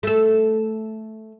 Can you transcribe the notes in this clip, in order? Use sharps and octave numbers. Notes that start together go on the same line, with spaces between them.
A3 A4